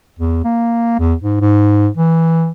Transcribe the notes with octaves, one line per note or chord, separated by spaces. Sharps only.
E2
A#3
E2
G#2
G#2
E3